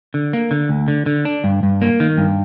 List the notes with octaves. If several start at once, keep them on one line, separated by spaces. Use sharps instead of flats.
D3
A#3
D3
D2
D3
D3
D4
G2
G2
A#3
D#3
G2